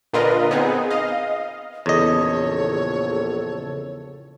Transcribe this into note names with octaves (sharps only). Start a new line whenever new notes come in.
A#2 D3 F4 A#4 B4 D#5
B3 C4 D#4 G#4
D#5 F5
A#1 E2 C#3 A4 C#5 D#5